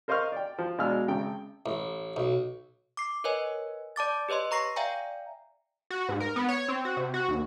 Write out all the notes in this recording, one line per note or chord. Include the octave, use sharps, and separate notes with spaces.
A#4 C5 D#5 F5 C#6 F6
D5 G5
F3
B2 G#3 D4 F5 E6 F6
G#1 C#3 G5
A1
B1
D6 C7
A#4 B4 C#5 D#5 G#5
D5 A5 D6 A6
G4 B4 C#5 D#5 C6
B4 A#5 C#6 A#6 C7
D5 E5 F5 G5 G#5 A#5
F#4
G#2
A#4
B3
C#5
C4
F#4
C3
F#4
D#2